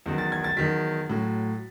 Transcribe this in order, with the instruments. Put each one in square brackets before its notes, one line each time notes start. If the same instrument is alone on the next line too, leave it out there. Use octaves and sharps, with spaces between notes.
[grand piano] E2 D#3 F#3
A6
G#6
A6
E2 D#3 F#3 B6
A2 F#3